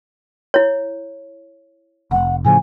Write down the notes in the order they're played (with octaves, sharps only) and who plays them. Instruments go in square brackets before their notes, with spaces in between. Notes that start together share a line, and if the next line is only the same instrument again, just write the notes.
[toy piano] E4 C#5
[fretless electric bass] F1 [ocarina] F#5
[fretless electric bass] A2 C#3 F3 [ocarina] G#5